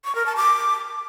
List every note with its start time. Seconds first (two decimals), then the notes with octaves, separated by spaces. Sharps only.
0.04 C#6
0.15 A#4
0.26 A5
0.36 D6